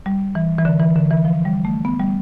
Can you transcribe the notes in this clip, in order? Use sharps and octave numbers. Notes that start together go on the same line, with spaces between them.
G3
E3
E3
D3
E3
D3
E3
F3
G3
A3
B3
G3